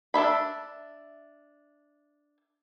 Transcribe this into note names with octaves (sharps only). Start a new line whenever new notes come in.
D4 A4 E5 B5